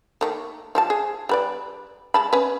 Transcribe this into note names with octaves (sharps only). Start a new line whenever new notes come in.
D#3 A3 A#3
F3 G3 A5
G#4
G3 B4 D5
G#3 A5 B5
C#4 B4